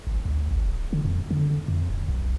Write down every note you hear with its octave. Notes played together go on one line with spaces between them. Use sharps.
G#1
D2
G#1
D1
D3
F2
D3
F2
D#1
B1